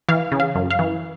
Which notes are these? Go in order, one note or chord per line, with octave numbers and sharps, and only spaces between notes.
E3 F5
C#3
F5
F#2
F5
E3